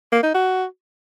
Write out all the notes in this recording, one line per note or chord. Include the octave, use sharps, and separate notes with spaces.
A#3
D#4
F#4